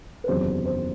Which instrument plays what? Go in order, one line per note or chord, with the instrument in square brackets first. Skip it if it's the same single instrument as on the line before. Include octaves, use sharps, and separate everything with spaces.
[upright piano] B4
F#1 E2 C3 D#3 F#3 C5
C5